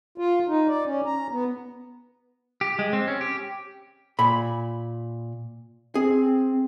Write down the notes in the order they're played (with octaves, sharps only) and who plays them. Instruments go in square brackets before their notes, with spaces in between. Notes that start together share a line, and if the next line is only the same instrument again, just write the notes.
[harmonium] F4
D#4
D5
C#4
A#5
B3
[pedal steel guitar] G4
G#3
C4
C#4
G4
[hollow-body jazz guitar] A#2 B5
[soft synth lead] C4 [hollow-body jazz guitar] G#4